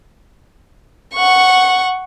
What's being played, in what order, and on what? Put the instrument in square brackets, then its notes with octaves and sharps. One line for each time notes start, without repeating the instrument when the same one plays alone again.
[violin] F#5 C#6